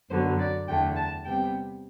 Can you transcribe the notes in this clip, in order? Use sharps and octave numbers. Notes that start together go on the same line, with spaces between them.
F#2 D3 F#3 B3 C5
D5
E2 D3 A3 G5
A5
C3 G3 B3 G5